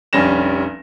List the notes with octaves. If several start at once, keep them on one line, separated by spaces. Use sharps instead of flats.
F1 A#1 G3 C#4 A#6 E7